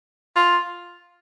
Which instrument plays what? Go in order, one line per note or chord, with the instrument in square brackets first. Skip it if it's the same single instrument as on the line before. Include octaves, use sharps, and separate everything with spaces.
[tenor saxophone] F4